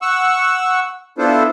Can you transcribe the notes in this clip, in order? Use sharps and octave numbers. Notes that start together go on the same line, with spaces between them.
F#5 C#6 E6
B3 D4 E4 F4 A4 C5